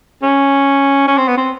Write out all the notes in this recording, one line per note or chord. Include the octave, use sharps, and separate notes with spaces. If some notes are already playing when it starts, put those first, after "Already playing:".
C#4
C#4
C4
B3
C4